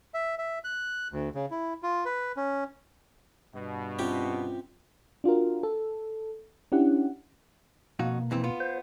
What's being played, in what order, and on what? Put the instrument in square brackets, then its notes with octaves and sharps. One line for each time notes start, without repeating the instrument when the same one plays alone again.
[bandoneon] E5
E5
F#6
D2
C#3
E4
F4
B4
C#4
[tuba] G2 [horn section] B2
[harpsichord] C3 G4 [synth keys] C#4 F4 G5
[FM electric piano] D4 F4 F#4 A#4
A4
C#4 D4 E4 G4 F#5
[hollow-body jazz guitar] F2 D#4 F#4 [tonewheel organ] B2 A#3
[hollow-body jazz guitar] F2 E3 C4
B3 F4
[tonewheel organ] C5